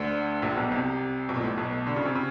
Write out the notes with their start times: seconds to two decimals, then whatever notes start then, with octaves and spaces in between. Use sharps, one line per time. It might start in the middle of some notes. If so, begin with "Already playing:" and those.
Already playing: D2 D3
0.42 A#1 A#2
0.56 B1 B2
0.72 C2 C3
1.29 B1 B2
1.36 A#2
1.43 A2
1.58 B1 B2
1.87 D3
1.96 C#3
2.06 C3
2.15 C#3